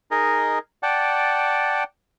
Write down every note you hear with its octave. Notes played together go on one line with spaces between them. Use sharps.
D#4 G#4 A#4 D#5
D5 F#5 G5 A5